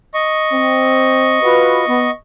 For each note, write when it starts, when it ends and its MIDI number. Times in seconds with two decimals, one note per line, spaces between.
0.14 2.11 75
0.14 2.11 85
0.53 1.37 60
1.43 1.84 65
1.43 1.84 66
1.43 1.84 71
1.88 2.09 59